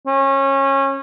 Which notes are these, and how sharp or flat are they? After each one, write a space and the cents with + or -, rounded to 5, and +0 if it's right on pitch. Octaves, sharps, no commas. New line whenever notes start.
C#4 -25